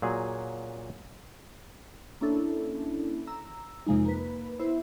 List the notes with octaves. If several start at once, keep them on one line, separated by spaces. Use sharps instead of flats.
A#2 F#3 G#4
A#3 C#4 D4 E4 A4
A#5 E6
F2 C3 F3 G#3 A#3 D#4
A#3 B4
B3 E4 C5 E5